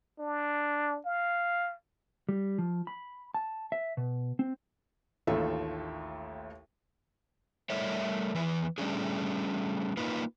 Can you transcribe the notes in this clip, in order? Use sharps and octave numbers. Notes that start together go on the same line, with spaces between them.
D4
F5
G3
F3
B5
A5
E5
B2
C4
A1 D#2 A3 F4 A4 E5
G3 A3 A#4 C#5 D5 E5
E2 E3 B4
G3 A3 C#4 D4 G#4
A#3 D#4 F4 B4